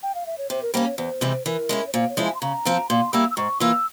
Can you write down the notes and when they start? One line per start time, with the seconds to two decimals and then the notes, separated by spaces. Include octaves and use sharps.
0.03 G5
0.15 F5
0.26 E5
0.38 C#5
0.50 C3 C5
0.62 A#4
0.74 G3 A#3 C#4 C5
0.86 C#5
0.98 E2 C5
1.21 C3 E3 G#3 C4
1.46 E3 A#4
1.69 G#3 C#4 E4
1.87 C#5
1.93 A#2 C5
2.09 C#5
2.17 F3 G#3 E4
2.25 G#5
2.35 C6
2.41 C#3 A#5
2.65 F3 C4 F4
2.89 A#2 C6
3.13 G3 A#3 E4 E6
3.31 E6
3.37 G#2 C#6
3.60 E3 A#3 F4 E6